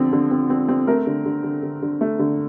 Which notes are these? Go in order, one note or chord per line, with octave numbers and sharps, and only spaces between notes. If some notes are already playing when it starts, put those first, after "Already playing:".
Already playing: D3 F3 C4
D3
C4
C4
C4
A3 A#4
D3
D3
D3
D3
D3
A3
D3